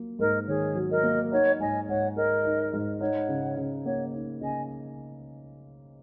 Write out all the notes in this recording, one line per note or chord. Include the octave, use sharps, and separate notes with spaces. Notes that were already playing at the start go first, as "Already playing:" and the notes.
Already playing: F#3 A#3
G#2 A#4 D#5
D#3 G#4 C#5
F#3
A#4 D#5
A#3
D#4 C#5 F#5
G#2 D#5 G#5
G#2 C#5 F#5
G#3 A#4 D#5
D#4
G#2
D#4 C#5 F#5
C#3
C#3
A#3 C#5 F#5
D#4
C#3 D#5 G#5